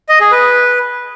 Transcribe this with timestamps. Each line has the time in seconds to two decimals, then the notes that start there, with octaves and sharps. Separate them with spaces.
0.09 D#5
0.20 G#4
0.31 B4